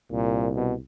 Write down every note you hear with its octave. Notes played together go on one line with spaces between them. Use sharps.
C2 A#2
B2